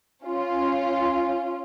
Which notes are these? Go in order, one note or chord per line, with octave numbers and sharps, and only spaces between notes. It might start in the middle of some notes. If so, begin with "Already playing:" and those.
C#4 F4